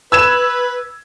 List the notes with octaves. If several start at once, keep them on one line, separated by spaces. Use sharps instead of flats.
B4 E6 G#6 E7